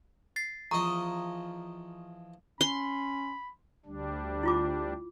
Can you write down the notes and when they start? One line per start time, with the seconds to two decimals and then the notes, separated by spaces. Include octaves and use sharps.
0.36 A6 C7
0.71 E2 F3 D#5 A#5 C#6 D#6
2.61 C#4 B5 C6
3.86 D2 G3 D4
4.43 E4 F4 D6